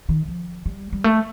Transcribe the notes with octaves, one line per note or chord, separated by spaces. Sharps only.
D#3
F3
G3
G3
A3